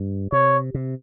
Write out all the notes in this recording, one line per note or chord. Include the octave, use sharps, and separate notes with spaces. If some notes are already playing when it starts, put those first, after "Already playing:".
Already playing: G2
C3 C#5
C3